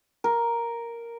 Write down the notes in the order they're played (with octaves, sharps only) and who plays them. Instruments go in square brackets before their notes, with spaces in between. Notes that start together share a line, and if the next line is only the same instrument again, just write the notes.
[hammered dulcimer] A#4